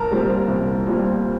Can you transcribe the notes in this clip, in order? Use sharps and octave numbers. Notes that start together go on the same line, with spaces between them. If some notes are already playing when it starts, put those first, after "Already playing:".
Already playing: C2 A#4 A5 A#5
A#2 G3 C4
C2
A#2 G3 C4